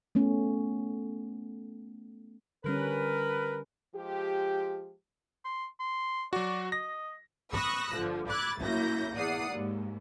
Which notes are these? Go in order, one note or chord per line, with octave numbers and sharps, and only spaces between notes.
A3 B3 C#4
D3 G3 C#4 A#4 B4
F3 G#3 G4
C6
C6
F#3 F#4 D5
D#5 A#6
B5 C#6 D#6 E6 F#6 A#6
G1 D3 F3
B5 D6 E6 F#6 G#6 A6
F#2 A#3 E4 C#5 G6 A#6
E2 D5 F#5 D#6 C7
D#2 G#2